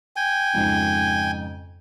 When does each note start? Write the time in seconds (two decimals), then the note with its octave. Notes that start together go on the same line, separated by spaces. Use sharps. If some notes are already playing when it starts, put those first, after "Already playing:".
0.16 G5 G#5
0.53 F2 G#2 C#3